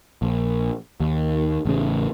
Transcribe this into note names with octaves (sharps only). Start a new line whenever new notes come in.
A#1
D#2
A1 C#3